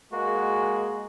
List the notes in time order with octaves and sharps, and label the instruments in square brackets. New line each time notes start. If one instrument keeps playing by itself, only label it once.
[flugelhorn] G#3 [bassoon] A#3 [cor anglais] F#4